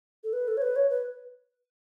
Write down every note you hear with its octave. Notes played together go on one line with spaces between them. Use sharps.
A4
B4
A4
C#5
B4
C#5
B4